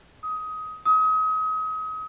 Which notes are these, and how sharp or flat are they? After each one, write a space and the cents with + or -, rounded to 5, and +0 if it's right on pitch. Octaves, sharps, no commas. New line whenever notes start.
D#6 +20
D#6 +35